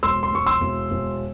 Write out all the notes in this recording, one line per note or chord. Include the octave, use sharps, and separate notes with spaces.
E1 C6 E6
C6
E1 C#6
C6 E6
E1
E1